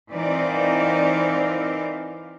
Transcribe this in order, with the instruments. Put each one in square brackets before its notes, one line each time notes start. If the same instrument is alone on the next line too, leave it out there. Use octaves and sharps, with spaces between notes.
[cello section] E3 C4 D#4 A#4 D5 F5